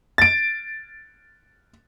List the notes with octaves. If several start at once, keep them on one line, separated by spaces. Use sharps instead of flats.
A6 D7